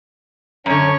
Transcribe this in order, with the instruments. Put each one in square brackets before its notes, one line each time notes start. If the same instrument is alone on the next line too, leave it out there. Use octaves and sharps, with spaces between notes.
[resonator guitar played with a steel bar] F#2 D3 [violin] C#4 C#5